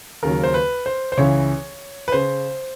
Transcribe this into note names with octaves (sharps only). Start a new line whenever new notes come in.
D#2 C#3 F#3 A#4
C5
B4
C5
C5
C#2 C#3 E3 C#5
B4
C#3 C5